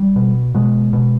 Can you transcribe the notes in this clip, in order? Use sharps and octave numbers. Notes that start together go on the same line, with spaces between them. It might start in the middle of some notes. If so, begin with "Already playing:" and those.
Already playing: G3
B2
B2 G#3
B2